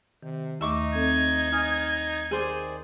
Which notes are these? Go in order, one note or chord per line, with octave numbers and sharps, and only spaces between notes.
C3 D#3
D#2 A3 D#4 D#5 E5 C#6 D6
C4 A4 D#5 G#6
D#4 G#5 D#6 F6
D#3 G#4 C5 D5